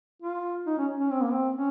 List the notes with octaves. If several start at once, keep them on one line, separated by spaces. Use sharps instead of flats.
F4
D#4
C#4
C#4
C4
A#3
C4
C#4